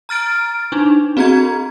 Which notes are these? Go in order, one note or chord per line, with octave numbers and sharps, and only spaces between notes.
A#5 F6 A6 D7
D4 D#4
C4 F#4 G#4 A#5 G#6